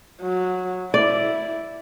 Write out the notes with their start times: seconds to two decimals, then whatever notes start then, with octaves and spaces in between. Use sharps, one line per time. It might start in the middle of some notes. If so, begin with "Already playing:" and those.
0.22 F#3
0.94 E4 D5